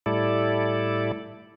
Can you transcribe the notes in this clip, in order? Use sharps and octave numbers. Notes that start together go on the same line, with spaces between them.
A2 G3 E4 A4 D5